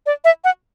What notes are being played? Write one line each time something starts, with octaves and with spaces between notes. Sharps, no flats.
D5
E5
F#5